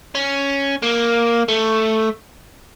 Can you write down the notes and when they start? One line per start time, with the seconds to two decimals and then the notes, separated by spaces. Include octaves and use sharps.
0.15 C#4
0.82 A#3
1.48 A3